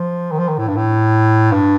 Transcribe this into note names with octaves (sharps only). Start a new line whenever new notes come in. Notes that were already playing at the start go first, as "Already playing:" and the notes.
Already playing: F3
D#3
F3
D#3
A2
G2
A2
G2